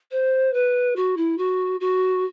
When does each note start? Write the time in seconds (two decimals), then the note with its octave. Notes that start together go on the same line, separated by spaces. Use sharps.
0.11 C5
0.53 B4
0.96 F#4
1.17 E4
1.38 F#4
1.80 F#4